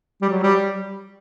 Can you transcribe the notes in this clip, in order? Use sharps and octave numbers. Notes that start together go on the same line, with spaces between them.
G3
F#3
G3